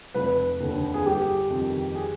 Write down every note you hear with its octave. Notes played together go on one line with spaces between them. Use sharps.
F1 B4
D#2 D3
G#4
G1 G4
F2
D#3
G#4